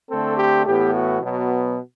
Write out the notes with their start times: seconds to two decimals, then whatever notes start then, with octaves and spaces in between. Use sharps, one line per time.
0.09 D3 A3 C4 A4
0.37 G4
0.65 A2 E3 B3 G4
0.94 F#4
1.22 B2 F#3 B3